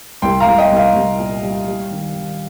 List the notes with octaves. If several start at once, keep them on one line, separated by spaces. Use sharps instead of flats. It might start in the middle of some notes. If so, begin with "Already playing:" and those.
C2 G5 C6
F5 A#5
C2
D#5 G5
C2
F5
C2
A#2
G3
G3
D#3
D#3